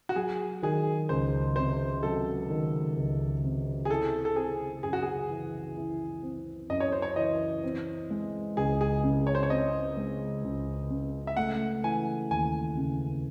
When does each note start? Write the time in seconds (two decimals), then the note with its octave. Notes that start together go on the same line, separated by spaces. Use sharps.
0.09 F#4
0.16 F#3 G#4
0.63 D#3 G#4
1.09 C#2 C5
1.56 C3 C5
2.03 F#3 A4
2.50 D#3
2.97 C#2
3.43 C3
3.85 G#4
3.90 E4 A4
4.25 A4
4.36 C4 G#4
4.83 F#2 G#4
4.93 F#4
5.02 G#4
5.30 E3
5.77 E4
6.23 C4
6.70 F#2 D#5
6.80 C#5
6.92 C5
7.02 C#5
7.16 E3 D#5
7.64 C4
8.10 G#3
8.57 C#2 G#4
8.81 G#4
9.04 C#3
9.27 C#5
9.35 C5
9.43 C#5
9.50 C4 D#5
9.97 G#3
10.44 C#2
10.90 C#3
11.27 E5
11.37 A3 F#5
11.84 E3 G#5
12.30 D#2 G#5
12.77 C#3